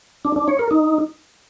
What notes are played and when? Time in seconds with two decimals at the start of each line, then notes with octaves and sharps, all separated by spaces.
0.25 D4
0.36 D4
0.48 C#5
0.59 A#4
0.71 D#4